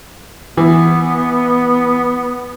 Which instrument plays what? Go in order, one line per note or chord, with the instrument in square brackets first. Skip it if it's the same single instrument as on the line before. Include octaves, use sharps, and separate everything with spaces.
[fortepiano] E3 [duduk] B3